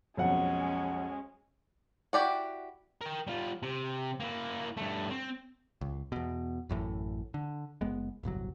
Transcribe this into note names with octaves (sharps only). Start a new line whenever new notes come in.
B1 F2 G#3 C#4 F#5
E4 F#4 G4 D5 F#5
A#4 G5
G3 F4
C3
A#3 E4
G2 A3
C4
C#2
E2 B2
A1 F#2 A2 E3
D3
F#1 G#3 B3
D1 G1 C2 F#3